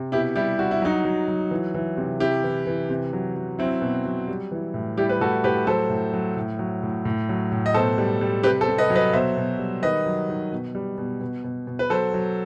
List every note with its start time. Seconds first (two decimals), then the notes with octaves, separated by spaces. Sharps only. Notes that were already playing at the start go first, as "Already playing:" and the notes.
Already playing: C3
0.12 B2 E4 G4
0.36 G3 E4 G4
0.59 G3 F#4
0.71 E4
0.82 F#3 D#4 F#4
1.05 F#3
1.28 F#3
1.51 E3
1.75 E3
1.97 C3
2.20 C3 E4 G4
2.44 E3
2.67 E3
2.90 C3
3.13 F#3
3.36 F#3
3.59 F#3 C4 E4
3.82 B2
4.05 F#3
4.28 G3
4.51 E3
4.74 A2
4.97 G3 E4 G4
5.09 B4
5.21 A2 F#4 A4
5.44 A2 G4 B4
5.67 F#3 A4 C5
5.90 A2
6.13 F#3
6.36 A2
6.59 F#3
6.83 A2
7.05 A2
7.29 F#3
7.52 A2
7.66 D#5
7.74 B2 A4 C5
7.98 G3
8.21 G3
8.43 C3 G4 B4
8.61 A4 C5
8.67 C3
8.78 B4 D#5
8.90 F#3
8.96 B4 D#5
9.13 B2 C5 E5
9.37 B2
9.59 G3
9.82 D#3 B4 D#5
10.06 F#3
10.29 D#3
10.52 B2
10.75 G3
10.98 B2
11.21 B2
11.44 B2
11.67 B2
11.79 B4
11.90 F#3 A4 C5
12.14 F#3